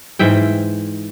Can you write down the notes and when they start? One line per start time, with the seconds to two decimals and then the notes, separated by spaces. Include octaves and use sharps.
0.19 G#2 E3 E5 G5